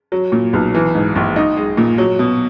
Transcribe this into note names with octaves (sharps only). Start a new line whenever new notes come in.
F#3
A#2
B1
E3
G#2
A#1
D#4
G#3
A#2
F#3
B2